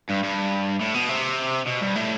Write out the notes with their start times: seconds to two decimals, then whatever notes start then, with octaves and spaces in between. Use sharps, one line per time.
0.09 G2
0.23 G2
0.80 A2
0.94 B2
1.09 C3
1.66 B2
1.81 G2
1.95 A2